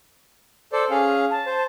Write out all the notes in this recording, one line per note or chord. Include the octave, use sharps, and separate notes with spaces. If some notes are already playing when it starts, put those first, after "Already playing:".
A4 C5 D5
C#4 G#4 F5
A5
C5